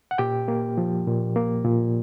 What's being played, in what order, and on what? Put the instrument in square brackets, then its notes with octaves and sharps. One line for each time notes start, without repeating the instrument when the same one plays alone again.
[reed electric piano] F#5
A#2 G4 G5
A#3
F3
A#2
A#3
A#2